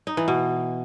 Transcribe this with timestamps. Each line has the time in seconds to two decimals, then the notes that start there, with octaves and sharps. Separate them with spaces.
0.07 D#4
0.17 E3
0.28 B2